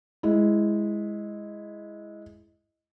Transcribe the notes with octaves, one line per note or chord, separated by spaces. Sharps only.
G#3 E4